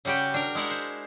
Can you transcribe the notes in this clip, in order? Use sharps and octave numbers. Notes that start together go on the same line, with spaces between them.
C#3 G3 F#4 G4 G5
D4 A#4
G#3 E4 A#4 F#5
C5